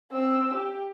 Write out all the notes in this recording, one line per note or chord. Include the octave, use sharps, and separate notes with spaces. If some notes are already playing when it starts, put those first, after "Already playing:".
C4 E6
G4